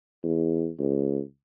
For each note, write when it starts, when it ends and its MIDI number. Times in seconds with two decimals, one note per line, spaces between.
0.23 0.69 40
0.79 1.20 37